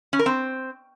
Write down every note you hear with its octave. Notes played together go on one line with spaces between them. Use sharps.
C#4
A#4
C4